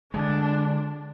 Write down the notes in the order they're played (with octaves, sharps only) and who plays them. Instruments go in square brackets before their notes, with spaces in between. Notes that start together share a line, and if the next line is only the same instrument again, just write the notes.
[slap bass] D3 G#3 [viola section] D4